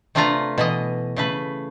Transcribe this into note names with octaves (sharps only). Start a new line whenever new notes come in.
C3 A3 D4 F4 B4 A#5
B2 E3 D#5
C#3 A3 B4